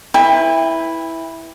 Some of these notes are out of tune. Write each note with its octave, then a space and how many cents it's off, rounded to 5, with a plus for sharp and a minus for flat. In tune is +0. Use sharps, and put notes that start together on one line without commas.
E4 -5 B4 +0 G5 +35